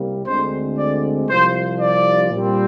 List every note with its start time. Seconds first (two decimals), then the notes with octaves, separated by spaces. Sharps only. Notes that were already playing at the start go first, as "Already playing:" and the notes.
Already playing: C2 C3 G3 A#3
0.26 D2 D3 G#3 C4 C5
0.77 D5
1.29 C2 C3 F3 C5
1.79 D5
2.30 A#2 G3 C4